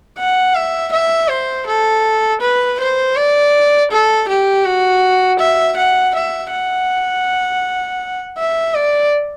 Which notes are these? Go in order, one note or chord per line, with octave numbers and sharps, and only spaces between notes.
F#5
E5
E5
C5
A4
B4
C5
D5
A4
G4
F#4
E5
F#5
E5
F#5
E5
D5